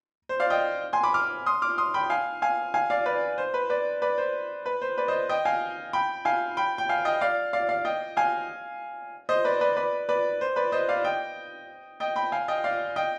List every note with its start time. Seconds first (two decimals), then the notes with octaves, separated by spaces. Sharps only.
0.29 C5
0.40 D5 F5
0.50 D#5 G5
0.93 G#5 C6
1.03 B5 D6
1.14 D6 F6
1.46 C6 D#6
1.62 D6 F6
1.78 C6 D#6
1.94 G5 B5
2.10 F5 G#5
2.42 F5 G#5
2.74 F5 G#5
2.90 D5 F5
3.06 B4 D5
3.38 C5
3.54 B4
3.70 B4 D5
4.02 B4 D5
4.18 C5
4.66 B4
4.82 C5
4.98 B4 D5
5.08 C5 D#5
5.29 D#5 G5
5.45 F5 G#5
5.93 G5 B5
6.25 F5 G#5
6.57 G5 B5
6.78 G5
6.89 F5 G#5
7.05 D#5 G5
7.21 D5 F5
7.53 D5 F5
7.69 D5 F5
7.85 D#5 G5
8.17 F5 G#5
9.29 C5 D#5
9.45 B4 D5
9.61 B4 D5
9.77 B4 D5
10.09 B4 D5
10.41 C5
10.56 B4 D5
10.72 C5 D#5
10.89 D5 F5
11.04 D#5 G5
12.00 D#5 G5
12.16 G5 B5
12.32 F5 G#5
12.48 D#5 G5
12.64 D5 F5
12.96 D#5 G5